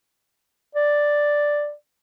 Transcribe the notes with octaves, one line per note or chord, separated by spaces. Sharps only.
D5